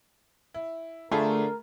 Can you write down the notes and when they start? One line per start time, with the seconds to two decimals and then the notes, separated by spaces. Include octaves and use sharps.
0.54 E4
1.11 D3 A3 F4 G#4 A#4 B5